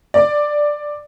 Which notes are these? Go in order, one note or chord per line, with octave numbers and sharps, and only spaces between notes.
D5